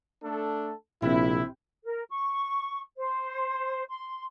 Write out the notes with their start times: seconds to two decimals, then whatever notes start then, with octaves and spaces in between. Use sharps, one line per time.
0.23 A3 D4 A4
1.02 A#1 C3 E4
1.84 A#4
2.10 C#6
2.97 C5
3.90 C6